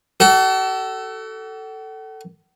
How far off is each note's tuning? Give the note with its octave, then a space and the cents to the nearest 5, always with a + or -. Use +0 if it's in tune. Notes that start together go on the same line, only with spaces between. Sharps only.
F#4 +45 A4 +5